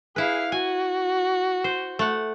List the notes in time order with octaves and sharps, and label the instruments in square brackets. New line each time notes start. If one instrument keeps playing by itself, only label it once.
[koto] E4 B4 [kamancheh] G#4 F5
[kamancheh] F#4 [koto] G#5
[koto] C5
A3 F#5